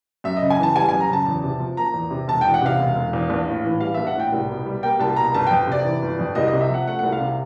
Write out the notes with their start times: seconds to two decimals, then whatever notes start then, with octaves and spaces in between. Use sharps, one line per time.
0.24 F#2 E5
0.37 D#5
0.42 C#3
0.50 G#5
0.59 E3 A5
0.76 G3 G#5
0.89 F#2 G#5
1.00 A#5
1.10 C#3 A5
1.26 E2
1.43 C3
1.60 F3
1.77 A#3 A#5
1.94 E2
2.11 C3
2.28 E1 A5
2.41 E2 G5
2.54 F#5
2.62 C3 F5
2.79 E1
2.96 E1
3.13 E2
3.30 A#1
3.48 A2
3.65 E3
3.80 G3 F5
3.94 A#1 E5
4.07 F#5
4.15 A2 G5
4.32 C2
4.50 B2
4.66 G3
4.83 A#3 G5
5.00 C2 A5
5.16 B2 A#5
5.34 G1 A5
5.47 F2 G5
5.67 C3 D5
5.85 E3
6.02 G1
6.19 F2
6.35 C2 D#5
6.48 C3 D#5
6.61 E5
6.70 F3 F#5
6.87 A3 F#5
6.99 C2 F#5
7.12 F5
7.20 C3